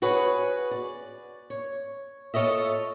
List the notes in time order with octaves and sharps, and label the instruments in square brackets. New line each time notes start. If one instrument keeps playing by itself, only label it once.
[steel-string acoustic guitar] F#4 G#4 B4 C#5
D5
C#5
F4 A4 C#5 D#5 E5